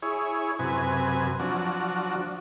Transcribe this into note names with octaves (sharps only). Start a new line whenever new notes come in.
E4 G#4 C#5
F#2 C3 B4 G#5
F3 F#3 D4 F#4